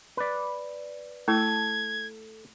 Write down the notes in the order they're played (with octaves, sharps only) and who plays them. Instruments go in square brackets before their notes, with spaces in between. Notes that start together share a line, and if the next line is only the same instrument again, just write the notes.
[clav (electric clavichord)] B4 D5
[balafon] A3 E4 [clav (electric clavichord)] A4 [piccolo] G#6